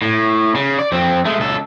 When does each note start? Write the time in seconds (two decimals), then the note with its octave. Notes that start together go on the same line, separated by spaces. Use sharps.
0.02 A2
0.55 C#3
0.79 D5
0.92 F2 C4
1.25 G#3 A3
1.40 C#2 A4